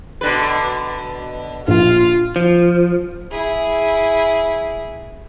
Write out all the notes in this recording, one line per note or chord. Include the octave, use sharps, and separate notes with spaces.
B2 D3 B4
A#1 F4
F3
E4 G#4